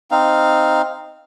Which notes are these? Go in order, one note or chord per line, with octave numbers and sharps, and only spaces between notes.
C4 D#4 F5